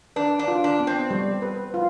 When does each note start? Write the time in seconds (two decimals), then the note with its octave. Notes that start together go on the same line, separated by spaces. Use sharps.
0.16 D4 B4
0.39 D4
0.48 F4
0.64 D4
0.80 B3
0.87 C4
1.10 G3
1.42 B4
1.74 F4